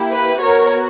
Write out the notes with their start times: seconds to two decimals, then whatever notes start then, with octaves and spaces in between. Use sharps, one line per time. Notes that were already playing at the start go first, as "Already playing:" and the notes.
Already playing: A#3 E4 G4
0.11 B4
0.41 B3 F#4 A#4 C#5